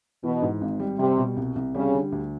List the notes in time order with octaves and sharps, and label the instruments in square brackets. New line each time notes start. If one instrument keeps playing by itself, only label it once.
[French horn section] B2 [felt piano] E3
[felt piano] G#2
G#1
G3
[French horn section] C3 [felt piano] G3
[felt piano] B2
C2
C2
[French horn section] C#3 [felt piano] G3
[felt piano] D3
D2